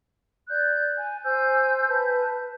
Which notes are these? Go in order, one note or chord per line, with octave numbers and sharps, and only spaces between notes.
D5 F#6 G6
G#5
C5 G#5 E6 G6
B4 A5 G6